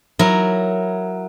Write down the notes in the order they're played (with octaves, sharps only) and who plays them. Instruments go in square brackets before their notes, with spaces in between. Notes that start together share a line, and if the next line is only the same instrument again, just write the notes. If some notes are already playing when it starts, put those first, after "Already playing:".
[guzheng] F#3 E4 A#4